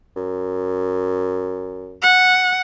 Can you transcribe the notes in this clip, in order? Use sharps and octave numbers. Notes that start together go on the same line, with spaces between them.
F#2
F#5